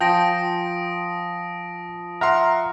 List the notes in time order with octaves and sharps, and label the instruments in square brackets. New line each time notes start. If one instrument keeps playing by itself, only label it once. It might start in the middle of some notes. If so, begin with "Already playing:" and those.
[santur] F3 G#5 [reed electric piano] G5 [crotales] D#6 A#6 D7
[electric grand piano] E5 F#5 C6 [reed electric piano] A#5 F6